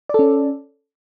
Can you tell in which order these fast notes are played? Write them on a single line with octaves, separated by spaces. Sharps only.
D5 A4 C#4